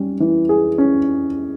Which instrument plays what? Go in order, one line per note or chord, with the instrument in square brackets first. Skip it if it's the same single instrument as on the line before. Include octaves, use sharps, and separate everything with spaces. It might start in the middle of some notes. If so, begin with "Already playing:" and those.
Already playing: [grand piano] G3 C#4
E3
G#4
C#4